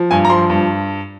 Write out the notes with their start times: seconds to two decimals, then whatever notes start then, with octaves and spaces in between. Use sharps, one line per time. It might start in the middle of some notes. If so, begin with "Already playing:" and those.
Already playing: F3
0.11 G2 G#5
0.25 A#5
0.30 F3 C6
0.50 G2